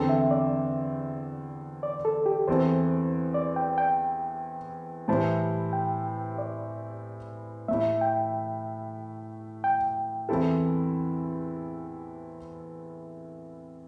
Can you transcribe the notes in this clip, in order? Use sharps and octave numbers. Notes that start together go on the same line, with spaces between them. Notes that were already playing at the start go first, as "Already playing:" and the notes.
Already playing: E2 D3 C4 A4 G5
E5
D5
D5
A4
G4
E2 E3 C4 A4 C5
D5
G5
G5
A2 E3 G3 E4 C5 A5
G5
D5
A2 A3 E4 E5
G5
G5
E2 E3 C4 E4 A4